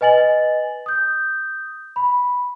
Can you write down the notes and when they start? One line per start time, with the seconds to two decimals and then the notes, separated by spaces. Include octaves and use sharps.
0.01 B4 D#5 G#5 A6 F#7
0.86 D#6 G6
1.96 B5